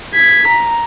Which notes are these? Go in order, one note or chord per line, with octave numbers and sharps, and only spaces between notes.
G#6 B6
A#5